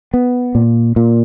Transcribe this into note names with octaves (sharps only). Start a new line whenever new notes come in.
B3
A#2
A#2